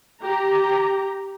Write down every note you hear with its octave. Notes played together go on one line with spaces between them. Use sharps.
G4 A#5